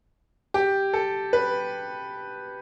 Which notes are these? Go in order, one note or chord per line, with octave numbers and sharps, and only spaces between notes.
G4
A4
B4